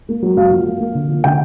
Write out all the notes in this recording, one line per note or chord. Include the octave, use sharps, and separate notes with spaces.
A#3
F#3
F#2 F5
F3
A#3
A#3
D3
F3
D3 G5